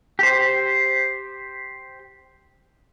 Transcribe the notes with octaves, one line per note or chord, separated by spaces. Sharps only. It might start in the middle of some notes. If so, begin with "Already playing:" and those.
G4 C5